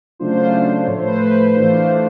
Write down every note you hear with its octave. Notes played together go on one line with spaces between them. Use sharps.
C#3 F#3 A3 D4 F4 C5
A2 F3 A3 C#5
C5
B4
C5
E3 A3 D4 F4 C5